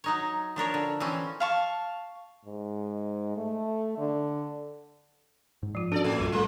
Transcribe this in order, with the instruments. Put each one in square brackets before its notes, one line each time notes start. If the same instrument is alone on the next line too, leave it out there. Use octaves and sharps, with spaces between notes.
[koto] F#3 D#4 C#5
F3 D4 A#4 C#5
D3
E3 F3 C4 C#4
[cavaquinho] F5 A5 C#6
[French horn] G#2
A3
D3
[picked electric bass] G#2
[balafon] F3 F4
[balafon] C#4 F#4 [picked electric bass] D4 [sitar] A4 D5
[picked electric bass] A2 [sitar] A3
[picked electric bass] B1 F#2 [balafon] G3 F4 A4
[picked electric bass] A2 [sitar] G#3 A#3